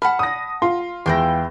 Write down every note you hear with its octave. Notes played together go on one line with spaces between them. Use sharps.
F#5 A5 B5 F6
D#6 A#6
F4 C6
E2 E4 G5 C6 A#6